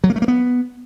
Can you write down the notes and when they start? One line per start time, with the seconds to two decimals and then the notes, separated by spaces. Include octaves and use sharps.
0.04 F#3
0.10 A#3
0.16 A3
0.22 A#3
0.28 B3